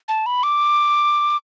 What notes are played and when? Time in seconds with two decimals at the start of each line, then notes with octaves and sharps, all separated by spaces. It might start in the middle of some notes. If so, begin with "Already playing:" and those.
0.09 A5
0.26 B5
0.43 D6